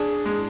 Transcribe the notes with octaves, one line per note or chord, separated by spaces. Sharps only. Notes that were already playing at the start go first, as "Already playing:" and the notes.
Already playing: D4 G#4
G#3